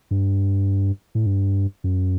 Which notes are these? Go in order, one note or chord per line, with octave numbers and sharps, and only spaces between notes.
G2
A2
G2
F#2